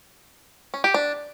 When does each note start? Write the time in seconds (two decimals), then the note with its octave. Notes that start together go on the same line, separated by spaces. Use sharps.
0.74 C#4
0.84 G4
0.94 D4